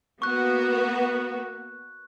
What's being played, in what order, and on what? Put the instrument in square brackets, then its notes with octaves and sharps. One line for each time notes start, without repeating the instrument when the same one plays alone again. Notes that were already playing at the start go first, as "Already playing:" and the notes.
[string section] A#3 B3 F#4 [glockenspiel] C#6 F#6